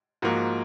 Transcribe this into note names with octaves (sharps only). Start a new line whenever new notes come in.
G#2 F3 A#3 F#4